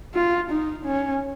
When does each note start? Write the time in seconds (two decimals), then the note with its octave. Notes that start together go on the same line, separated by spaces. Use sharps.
0.15 F4
0.51 D#4
0.86 C#4